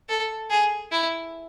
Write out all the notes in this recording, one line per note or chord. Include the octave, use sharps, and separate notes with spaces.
A4
G#4
E4